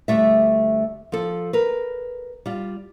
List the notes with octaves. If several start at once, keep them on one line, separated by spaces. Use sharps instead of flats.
D2 G3 A3 E5
F3 A4
A#4 B4
G3 F4